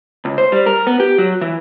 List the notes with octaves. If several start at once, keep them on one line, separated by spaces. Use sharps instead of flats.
C#2
C5
G3
A#4
B3
G4
F#3
E3